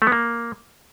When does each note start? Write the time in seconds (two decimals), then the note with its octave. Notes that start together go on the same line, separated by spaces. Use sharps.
0.02 A3
0.07 B3
0.12 A#3